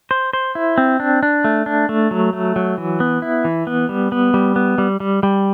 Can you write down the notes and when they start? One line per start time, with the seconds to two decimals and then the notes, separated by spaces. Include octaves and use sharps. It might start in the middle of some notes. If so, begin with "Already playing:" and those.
0.11 C5
0.33 C5
0.55 E4
0.78 C4
1.00 D4
1.23 D4
1.44 A3
1.66 D4
1.89 A3
2.11 F#3
2.33 A3
2.56 F#3
2.78 E3
3.00 B3
3.22 E4
3.45 E3
3.67 B3
3.89 G3
4.12 B3
4.34 G3
4.56 B3
4.78 G3
5.00 G3
5.23 G3